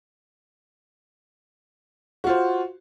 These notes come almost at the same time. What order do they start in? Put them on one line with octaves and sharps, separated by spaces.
F#4 F4 C5